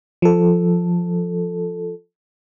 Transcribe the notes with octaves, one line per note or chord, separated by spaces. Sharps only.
F3 A4